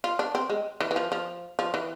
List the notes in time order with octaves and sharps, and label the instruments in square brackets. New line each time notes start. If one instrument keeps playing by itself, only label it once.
[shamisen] F4
D4
C4
G#3
E3
E3
F3
F3
F3
E3